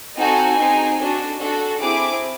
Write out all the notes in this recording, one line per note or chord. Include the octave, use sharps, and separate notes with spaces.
C4 D#4 F#4 A4 G#5
C4 D#4 G#4
D4 F#4 A4
D4 F#4 A4
C4 E4 G#4 D6